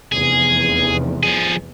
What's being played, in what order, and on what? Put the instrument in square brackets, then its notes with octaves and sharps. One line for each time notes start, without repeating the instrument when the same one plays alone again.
[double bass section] F1 E2 [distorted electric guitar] G#4
[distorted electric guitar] F3 G#4